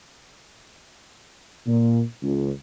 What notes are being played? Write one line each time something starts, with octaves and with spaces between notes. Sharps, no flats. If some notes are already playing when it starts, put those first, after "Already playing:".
A#2
C#2